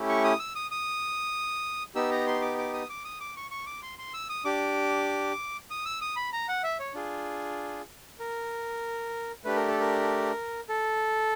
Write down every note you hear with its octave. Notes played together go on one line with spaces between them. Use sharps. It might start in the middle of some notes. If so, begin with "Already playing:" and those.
Already playing: A3 C#4 E4 G4
C#6
D#6
E6
D#6
D#6
B3 D#4 G4 E6
A#5
C6
D6
D6
D#6
D6
D#6
D6
C#6
C#6
D6
C6
C6
E6
D#6
D4 G4 D6
D#6
E6
D#6
B5
A#5
F#5
E5
C#5
D4 F4 G#4
A#4
A3 D4 G4 B4
A#4
A4
A#4
A4